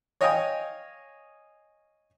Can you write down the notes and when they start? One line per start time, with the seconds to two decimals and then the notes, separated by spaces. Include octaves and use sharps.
0.21 C#5 D#5 F5 G5 G#5 D#6